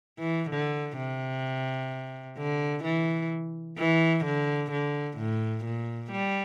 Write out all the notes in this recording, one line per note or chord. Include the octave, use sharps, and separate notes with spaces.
E3
D3
C3
D3
E3
E3
D3
D3
A2
A#2
G3